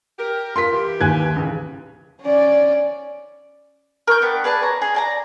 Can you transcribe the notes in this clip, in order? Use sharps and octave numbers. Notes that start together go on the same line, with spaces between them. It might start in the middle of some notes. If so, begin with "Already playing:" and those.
G4 A#4
F4 A#4 C6 B6
E3 G4
D#2 G#5 F#6 G#6
A1 C#3
C#4 D5
A#4 C#6 G6
B3 D4 G4
G#4 B4 D5 A5
C#5 A#5
G#4
D5 G#5 A#5